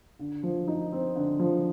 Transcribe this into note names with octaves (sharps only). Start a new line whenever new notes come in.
D3
F3
D#4
C4
D3
F3